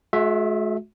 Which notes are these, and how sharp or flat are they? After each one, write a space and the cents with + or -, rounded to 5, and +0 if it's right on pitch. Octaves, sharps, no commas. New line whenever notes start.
G#3 +45 F#4 -30 E5 +0